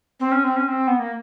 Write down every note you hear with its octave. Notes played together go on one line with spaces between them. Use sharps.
C4
C#4
C4
C#4
C4
B3
A#3